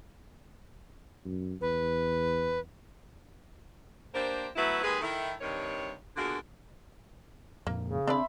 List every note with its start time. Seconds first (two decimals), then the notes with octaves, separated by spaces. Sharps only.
1.25 F#2
1.61 E2 B4
4.14 A#3 D4 G4 A#4 C5
4.56 F#3 A3 B3 E4
4.82 D#2 G#3 G#4 B4
5.01 D#3 E4 A4
5.40 G2 C3 D#3 C#5
6.17 B2 D3 A#3 F4 F#4 G#4
7.67 F2 A#2 A#3
7.85 C#3
8.07 C4 D4 C5 D5 E5 B5